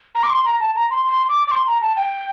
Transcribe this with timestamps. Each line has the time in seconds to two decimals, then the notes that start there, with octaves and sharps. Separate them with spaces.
0.15 A#5
0.23 D6
0.30 C6
0.45 A#5
0.60 A5
0.76 A#5
0.91 C6
1.06 C6
1.29 D6
1.47 D6
1.51 C6
1.67 A#5
1.82 A5
1.97 G5